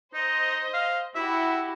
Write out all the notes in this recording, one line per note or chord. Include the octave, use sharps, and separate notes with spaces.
D#4 C5 D#5
F5
E4 F#4 G4 E5